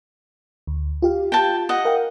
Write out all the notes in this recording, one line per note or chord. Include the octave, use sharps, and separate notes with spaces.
D2
F4 G4 F5
G5 A5
D#5 F#5
A#4 F5 G5